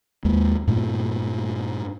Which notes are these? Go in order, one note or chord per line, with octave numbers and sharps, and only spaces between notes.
D#2 G#3
G2 A#2 A3